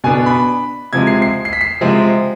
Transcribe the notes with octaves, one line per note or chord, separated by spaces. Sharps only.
B2 B3 D4 G#5
B5
C3 F3 G#3 G#6
C7
C7
C7
B6
C7
C3 F3 G#3 C4